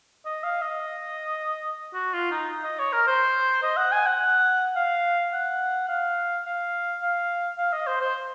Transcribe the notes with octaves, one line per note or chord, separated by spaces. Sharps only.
D#5
F5
D#5
F#4
F4
D#4
D#5
C#5
A#4
C5
D#5
F#5
G#5
F#5
F5
F#5
F5
F5
F5
F5
D#5
C5
C5